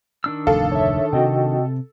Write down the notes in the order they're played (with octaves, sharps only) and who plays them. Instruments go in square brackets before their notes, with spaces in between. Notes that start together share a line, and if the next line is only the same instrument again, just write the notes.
[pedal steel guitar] D#3 D4 E6
[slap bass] F1 D2 G#2 [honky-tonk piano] A4 [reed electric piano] F5
[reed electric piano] C#5 E5
[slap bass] C3 C4 [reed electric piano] F#4 D#5 G5